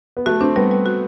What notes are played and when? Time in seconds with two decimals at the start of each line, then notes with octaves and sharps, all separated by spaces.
0.17 B3
0.26 A3 F#4
0.41 C4 D4
0.56 G3 B3
0.71 G3
0.86 F#4